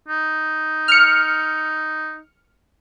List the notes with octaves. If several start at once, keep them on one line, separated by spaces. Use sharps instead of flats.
D#4
F6 C#7